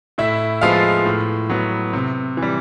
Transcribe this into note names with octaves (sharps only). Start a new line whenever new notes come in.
A2 E4 E5
F3 G#3 B3 F4 F5
A2
F#3 B3
C3
E3
G3